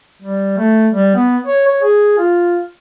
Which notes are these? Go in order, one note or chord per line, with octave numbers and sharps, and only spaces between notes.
G3
A3
G3
B3
C#5
C#5
G#4
F4